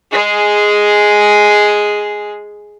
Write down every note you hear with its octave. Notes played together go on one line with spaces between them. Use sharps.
G#3 G#4